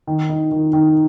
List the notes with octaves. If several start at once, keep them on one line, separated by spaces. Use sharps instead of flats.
D#3
D#4
D#3
D#3